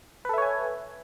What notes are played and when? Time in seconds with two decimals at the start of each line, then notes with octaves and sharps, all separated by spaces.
0.25 B4
0.29 A4
0.34 E5
0.38 C#5
0.42 G#5